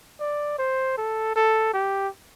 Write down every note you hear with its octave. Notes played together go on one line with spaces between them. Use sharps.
D5
C5
A4
A4
G4